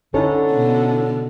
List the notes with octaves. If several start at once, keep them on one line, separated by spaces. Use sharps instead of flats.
D3 C#4 D#4 E4 A4 C#5
B2